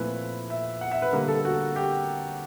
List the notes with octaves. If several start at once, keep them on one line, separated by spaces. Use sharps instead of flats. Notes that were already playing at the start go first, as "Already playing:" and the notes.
Already playing: A#2 F3 A3 C4 E4 B4
E5
F#5
E5
B4
D3 G3 A#3 A#4
A4
F#4
G4